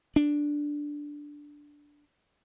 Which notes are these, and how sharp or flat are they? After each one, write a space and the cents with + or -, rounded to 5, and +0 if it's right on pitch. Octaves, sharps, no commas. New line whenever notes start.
D4 +0